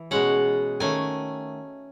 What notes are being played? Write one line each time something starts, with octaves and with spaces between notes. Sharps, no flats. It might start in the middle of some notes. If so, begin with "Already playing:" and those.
Already playing: E3
B2 G#3 C#4 F#5
D#3 A3 C#4 G#5